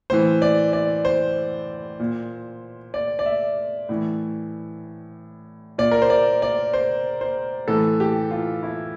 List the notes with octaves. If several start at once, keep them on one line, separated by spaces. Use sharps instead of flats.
A2 E3 C5
D5
D5
C5
A#2
D5
D5
E5
A2 E3
A#2 D5
A#4
C5
D5
D5
C5
C5
A2 E3 A4
G4
F4
E4